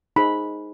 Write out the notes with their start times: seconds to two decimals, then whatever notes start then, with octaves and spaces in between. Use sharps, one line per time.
0.16 D#4 G#4 C5 B5